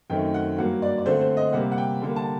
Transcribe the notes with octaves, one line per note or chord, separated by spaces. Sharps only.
F#2 D#3 A3 C4 G5
F#5
G2 F#3 A#3 F#5
D5
D5
D3 A3 C4 C5
C5
D#5
C3 G3 A#3 F#5
F#5
G5
D3 G3 A#3
A5